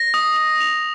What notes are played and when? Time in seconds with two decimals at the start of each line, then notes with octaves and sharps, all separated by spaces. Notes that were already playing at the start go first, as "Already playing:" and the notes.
Already playing: A#6
0.14 D#6
0.37 D#6
0.61 F7